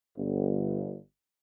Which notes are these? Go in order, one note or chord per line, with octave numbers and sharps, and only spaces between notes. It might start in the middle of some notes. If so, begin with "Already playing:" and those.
G1